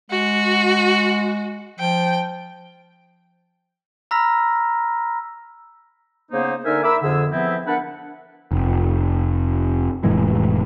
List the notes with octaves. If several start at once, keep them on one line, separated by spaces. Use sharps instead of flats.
G#3 F#4
F3 G5
A#5 B5 E6 F6 A#6 B6
C#3 A#3 B3 D#4 C5
D3 D#4 A#4 E5 G#5 F6
A#4 E5 B5 D6 E6
F2 D3 G#4 E6
E3 F3 B3 C4 E4 E5
B3 D4 A#4 B4 F#5
F1
F1 A2 E3 G#3